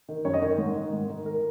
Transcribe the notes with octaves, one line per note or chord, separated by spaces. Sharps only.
D#3
F#2 C#5
D#5
D#3 C#5
A#4
G#2
D#3
G#2
D#3
A#4